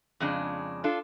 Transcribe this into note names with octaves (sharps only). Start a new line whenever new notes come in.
F2 C#3 G#3 D4
D4 F4 A4